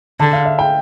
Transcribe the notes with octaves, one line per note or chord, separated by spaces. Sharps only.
D3 A5
F5
E5
G5